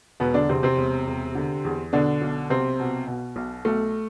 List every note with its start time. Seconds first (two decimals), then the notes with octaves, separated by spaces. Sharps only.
0.20 E1 B2 B3
0.34 D3 D4
0.49 E2 C3 C4
0.63 C3 C4
0.77 E1
1.07 E1
1.35 D3
1.65 E2
1.93 B2 D3 D4
2.22 B1
2.50 B1 C3 C4
2.80 B2
3.07 B2
3.36 B1
3.65 B1 A3